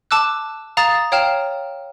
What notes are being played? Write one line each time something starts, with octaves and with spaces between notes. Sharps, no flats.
A5 D6 E6 F#6
F5 A#5 D#6 A6 E7
C#5 F5 G5 A#5 F6 E7